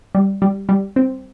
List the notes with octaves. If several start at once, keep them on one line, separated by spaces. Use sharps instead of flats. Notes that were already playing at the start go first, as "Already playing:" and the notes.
G3
G3
G3
C4